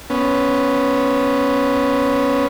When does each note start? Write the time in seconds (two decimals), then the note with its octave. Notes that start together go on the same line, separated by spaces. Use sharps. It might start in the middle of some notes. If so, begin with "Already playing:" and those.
0.10 B3 C#4